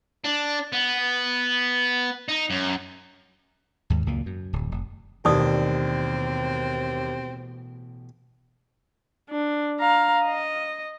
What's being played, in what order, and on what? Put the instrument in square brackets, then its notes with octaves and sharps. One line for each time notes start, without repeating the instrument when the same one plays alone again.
[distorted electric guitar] D4
B3
D#4
F#2
[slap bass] D#2 G#2
C#2 F#2 A#2 A#3
F#2
D1
F1
[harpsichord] A1 B2 [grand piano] D#2 [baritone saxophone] C4 [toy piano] D#4 D5 D#6
[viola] D4
F5 A#5
D#5